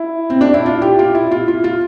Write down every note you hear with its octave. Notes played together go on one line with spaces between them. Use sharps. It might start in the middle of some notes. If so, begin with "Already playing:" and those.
Already playing: E4
C4
D4
E4
F4
G4
F4
E4
F4
F4
F4